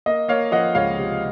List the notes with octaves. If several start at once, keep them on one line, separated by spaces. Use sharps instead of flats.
A#3 D#5
A#3 C#5 F5
F3 D#5 F#5
C#2 C#5 F5
C3